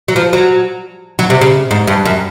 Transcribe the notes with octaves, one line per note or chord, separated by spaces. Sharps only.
F#3
F3
F#3
F#3
C3
C#3
G#2
G2
F#2